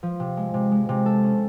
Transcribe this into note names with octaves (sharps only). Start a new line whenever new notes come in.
F3
C3
G#3
C3
G#3
C3
A4
C#4